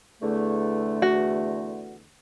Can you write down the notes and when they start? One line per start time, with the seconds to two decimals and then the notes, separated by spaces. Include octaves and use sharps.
0.22 E2 D3 A3
1.02 F#4